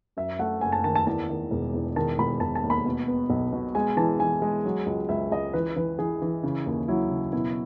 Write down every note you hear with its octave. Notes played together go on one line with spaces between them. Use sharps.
F#2 E5
A3 F#5
F#1 G#5
A5
D#3 A5
A5
E2 A5
D#3
E1
E2
D#3 A5
E1 B5
E1 A5
A5
D#2
B5
B2
B3
B1
B2
G#3 G#5
E3 A5
E3 G#5
G#3
F#3
C#2
C#2 E5
C#2 D#5
E3 B4
E3 B4
E3 G#4
E3
C#3
D#2
F#3 E4
C#3
B2 E4